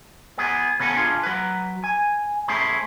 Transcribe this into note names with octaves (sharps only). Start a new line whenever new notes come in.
B3 G#4
C#3 B3 C#4 A4 G#5
D4 F4 G#4
F#3 B4
G#5
A3 C#4 E4 G#4 C5